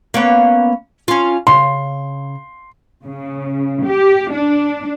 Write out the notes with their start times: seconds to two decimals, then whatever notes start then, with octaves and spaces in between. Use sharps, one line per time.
0.14 A#3 B3 C#4
1.08 C#4 F4
1.47 C#3 C6
3.05 C#3
3.85 G4
4.32 D4